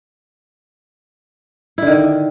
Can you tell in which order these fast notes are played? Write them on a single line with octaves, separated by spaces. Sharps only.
E4 D3 D#3